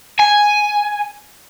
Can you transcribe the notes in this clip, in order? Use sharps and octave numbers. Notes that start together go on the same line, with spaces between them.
G#5